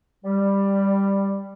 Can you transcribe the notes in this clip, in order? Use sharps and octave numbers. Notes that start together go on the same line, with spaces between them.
G3